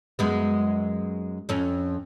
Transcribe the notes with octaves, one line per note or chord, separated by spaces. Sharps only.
F#2 G#3 B3
F2 C#4